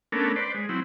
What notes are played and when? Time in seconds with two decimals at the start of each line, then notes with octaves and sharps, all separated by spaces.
0.12 A3 B3 C#4 D4 A#4
0.36 B4 C5 D5
0.54 G#3
0.69 F#3 C4 E4